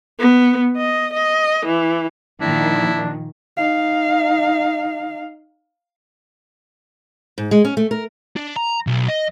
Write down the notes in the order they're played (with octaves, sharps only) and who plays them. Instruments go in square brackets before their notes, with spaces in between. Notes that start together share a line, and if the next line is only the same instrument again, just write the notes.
[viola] B3
D#5
D#5
E3
[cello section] A#2 D#3 F3 [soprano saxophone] D4 [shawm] E4
[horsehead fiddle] D#4 F5
[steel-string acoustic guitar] G#2
G#3
C#4
A3
A#4
[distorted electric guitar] D4
A#5
B1
D#5